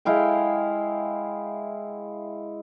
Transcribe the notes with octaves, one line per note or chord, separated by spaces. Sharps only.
G#3 E4 F5 G5